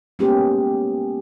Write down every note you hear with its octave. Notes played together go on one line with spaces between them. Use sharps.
G#3 A#3 B3 C#4 G4 G#4